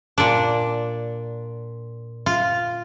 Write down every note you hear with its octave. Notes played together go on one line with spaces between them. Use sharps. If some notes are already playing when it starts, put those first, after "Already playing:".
A#2 D4
F4